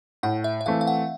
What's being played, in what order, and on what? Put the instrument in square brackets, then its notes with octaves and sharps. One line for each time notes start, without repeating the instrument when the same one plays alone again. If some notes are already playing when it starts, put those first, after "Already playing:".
[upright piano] A2 [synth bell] F#5
[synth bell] E5
E5
[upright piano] E3 A3 C4 [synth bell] F5
[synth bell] F5
F#5